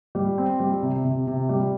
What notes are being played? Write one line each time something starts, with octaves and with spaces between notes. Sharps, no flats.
G3
C4
G3
C3
C3
C3
G3